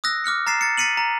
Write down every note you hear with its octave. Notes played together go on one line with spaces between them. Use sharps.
D#6 E6 F#6 A#6
D6 F6 F#6 C#7
A#5 A6 C7 E7
A6 C#7
A6 B6 C#7 D#7 F#7
A#5